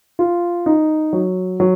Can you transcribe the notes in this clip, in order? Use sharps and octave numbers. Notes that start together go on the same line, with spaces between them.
F4
D#4
F#3
F#3